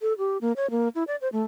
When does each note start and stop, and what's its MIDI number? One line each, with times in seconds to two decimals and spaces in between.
0.01 0.13 69
0.18 0.38 67
0.41 0.52 58
0.56 0.70 73
0.71 0.88 58
0.95 1.04 64
1.07 1.16 74
1.21 1.28 72
1.32 1.43 57